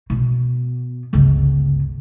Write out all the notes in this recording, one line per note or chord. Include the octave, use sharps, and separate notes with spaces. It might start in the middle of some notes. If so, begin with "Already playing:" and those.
B2
G1 C#2